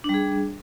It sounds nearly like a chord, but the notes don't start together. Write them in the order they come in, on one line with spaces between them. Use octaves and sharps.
D4 G3 G#4